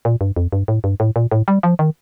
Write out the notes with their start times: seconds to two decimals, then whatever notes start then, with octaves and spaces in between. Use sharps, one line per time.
0.05 A#2
0.21 G2
0.36 F2
0.52 G2
0.68 A2
0.84 G2
1.00 A2
1.16 A#2
1.31 A2
1.48 G3
1.63 F3
1.79 D#3